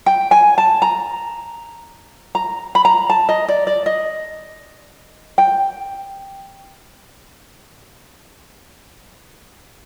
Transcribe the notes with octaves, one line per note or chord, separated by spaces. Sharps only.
G5
G#5
A5
A#5
A#5
B5
A#5
A5
D#5
D5
D5
D#5
G5